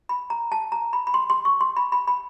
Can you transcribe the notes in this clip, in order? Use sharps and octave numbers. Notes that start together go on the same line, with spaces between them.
B5
A#5
A5
A#5
B5
B5
C6
C6
C#6
C6
B5
B5
B5